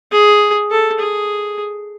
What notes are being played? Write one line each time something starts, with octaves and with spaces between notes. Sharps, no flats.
G#4
A4
G#4